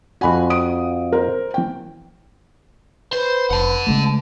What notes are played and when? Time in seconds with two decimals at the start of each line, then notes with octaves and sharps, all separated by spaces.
0.21 F2 F#4 G#5 B5
0.50 D#6 D7
1.12 A#4 C5
1.54 E3 G5
3.13 B4 C5
3.50 F1 F#5 A5
3.87 C#3 G#3 A3